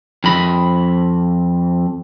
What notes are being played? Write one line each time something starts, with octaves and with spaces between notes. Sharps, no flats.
F2 B5